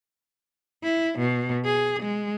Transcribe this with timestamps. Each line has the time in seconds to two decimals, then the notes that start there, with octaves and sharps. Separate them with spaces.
0.83 E4
1.19 B2
1.65 G#4
2.02 G#3